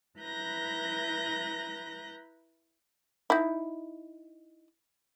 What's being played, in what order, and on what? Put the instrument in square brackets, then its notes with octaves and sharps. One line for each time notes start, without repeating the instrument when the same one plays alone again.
[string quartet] E4 B4 A#5 F#6 G6 A#6
[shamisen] D#4 E4